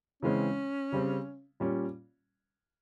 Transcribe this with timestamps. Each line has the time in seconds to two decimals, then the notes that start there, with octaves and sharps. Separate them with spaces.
0.23 C#3 E3 G#3 C4 C#4
0.92 C#3 G3 C4
1.60 A#2 G3 C#4